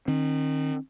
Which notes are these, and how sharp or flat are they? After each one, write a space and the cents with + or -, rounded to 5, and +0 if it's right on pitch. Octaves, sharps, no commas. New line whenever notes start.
D#3 -25 C4 +40